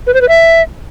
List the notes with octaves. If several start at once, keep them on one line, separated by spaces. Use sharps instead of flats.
B4
C5
B4
E5